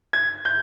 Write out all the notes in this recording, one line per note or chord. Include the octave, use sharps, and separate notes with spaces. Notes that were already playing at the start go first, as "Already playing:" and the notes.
G#6
G6